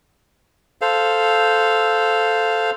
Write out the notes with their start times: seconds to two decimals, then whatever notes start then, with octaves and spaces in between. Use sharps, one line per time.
0.81 A4 C5 F5